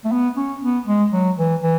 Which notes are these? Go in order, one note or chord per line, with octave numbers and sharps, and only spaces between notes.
A3
B3
C#4
B3
G#3
F#3
E3
E3